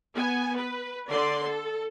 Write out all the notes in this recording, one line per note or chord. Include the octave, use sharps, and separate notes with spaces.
B3 G#5
B4
D3 D5 C6
A4